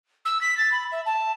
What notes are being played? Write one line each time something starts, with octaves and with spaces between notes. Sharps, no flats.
E6
B6
A6
B5
E5
A5